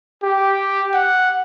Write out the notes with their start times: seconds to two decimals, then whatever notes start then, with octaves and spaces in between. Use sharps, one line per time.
0.23 G4
0.93 F#5